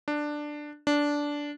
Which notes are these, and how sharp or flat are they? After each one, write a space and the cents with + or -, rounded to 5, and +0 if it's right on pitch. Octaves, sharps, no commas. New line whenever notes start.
D4 +10
D4 -10